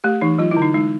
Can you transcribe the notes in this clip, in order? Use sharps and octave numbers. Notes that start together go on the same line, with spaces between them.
A3 G4
E3 D#4
F#3 F4
E4
D3
D#4
G#3 D#4